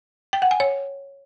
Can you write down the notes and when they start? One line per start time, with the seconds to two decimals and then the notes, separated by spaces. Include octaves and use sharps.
0.33 G5
0.42 F#5
0.51 G#5
0.60 C#5